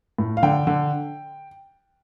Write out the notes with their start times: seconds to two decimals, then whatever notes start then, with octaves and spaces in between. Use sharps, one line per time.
0.18 A2
0.37 F5
0.43 D3 G5
0.67 D3